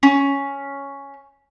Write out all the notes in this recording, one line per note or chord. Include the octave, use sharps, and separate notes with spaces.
C#4